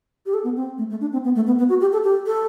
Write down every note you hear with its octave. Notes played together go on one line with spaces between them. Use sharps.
G4
A4
B3
C4
A3
A3
D4
C4
B3
A3
B3
B3
F#4
G4
A4
G4
A4